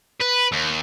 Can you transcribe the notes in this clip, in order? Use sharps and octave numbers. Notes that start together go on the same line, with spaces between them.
B4
D#2